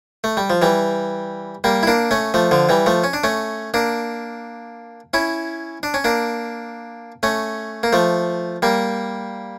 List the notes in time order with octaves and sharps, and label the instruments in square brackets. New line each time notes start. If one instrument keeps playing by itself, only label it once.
[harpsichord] A3
G3
F3
E3 G3
G3 A#3
E4
A#3 D4
A3 C#4
F3 A3
D3 F3
E3 G3
F3 A3
C#4
D4
A3 C#4
A#3 D4
C#4 E4
D4
C#4
A#3 D4
A3 C#4
A#3
F3 A3
G3 A#3